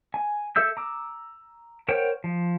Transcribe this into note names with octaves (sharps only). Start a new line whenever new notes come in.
G#5
A4 E5 E6 G6
A#5 D6 E6
A#4 C5 C#5 F#5 G5
F3